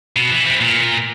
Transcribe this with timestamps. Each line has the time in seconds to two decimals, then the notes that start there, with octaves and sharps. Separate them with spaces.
0.16 B2
0.31 E3
0.45 B3 C4
0.61 A#2